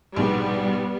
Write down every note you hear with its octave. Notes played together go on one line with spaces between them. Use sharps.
A#1 G#2 B2 G3 B3